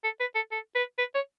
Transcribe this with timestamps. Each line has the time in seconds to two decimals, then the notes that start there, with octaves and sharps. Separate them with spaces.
0.04 A4
0.20 B4
0.35 A4
0.52 A4
0.75 B4
0.99 B4
1.15 C#5